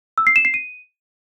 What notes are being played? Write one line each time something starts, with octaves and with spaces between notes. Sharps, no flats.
E6
C7
E7
C7
D#7